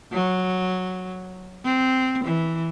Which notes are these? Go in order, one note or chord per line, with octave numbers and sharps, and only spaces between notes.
F#3
C4
E3